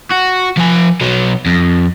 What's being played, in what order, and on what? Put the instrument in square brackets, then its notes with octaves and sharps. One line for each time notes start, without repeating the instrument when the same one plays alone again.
[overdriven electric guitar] F#4
F3 G#5
B2 F#3
F2